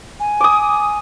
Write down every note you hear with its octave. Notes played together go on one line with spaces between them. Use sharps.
G#5
D6 D#6